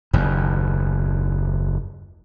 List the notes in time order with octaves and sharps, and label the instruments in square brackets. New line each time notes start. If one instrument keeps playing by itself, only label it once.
[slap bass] F#1 D#2